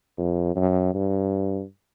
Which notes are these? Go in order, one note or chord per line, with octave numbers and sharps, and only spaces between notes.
F2
F#2
G2